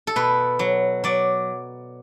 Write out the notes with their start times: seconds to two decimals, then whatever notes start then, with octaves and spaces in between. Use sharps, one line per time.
0.07 A4
0.16 B2 B4
0.59 F#3
1.04 F#3 D5